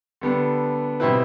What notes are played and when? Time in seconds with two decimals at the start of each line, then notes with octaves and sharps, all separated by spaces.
0.21 D3 G3 B3 D4 A4
1.00 B2 G3 C4 E4 B4